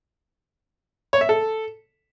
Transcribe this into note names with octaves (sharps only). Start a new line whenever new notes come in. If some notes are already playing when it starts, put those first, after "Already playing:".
C#5
E5
A4